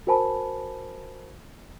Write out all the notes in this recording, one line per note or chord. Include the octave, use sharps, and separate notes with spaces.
F#4 A#4 C5 G#5 A5 B5